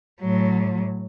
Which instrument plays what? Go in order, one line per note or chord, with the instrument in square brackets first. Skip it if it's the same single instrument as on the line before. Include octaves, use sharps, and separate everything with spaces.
[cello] A2 F#3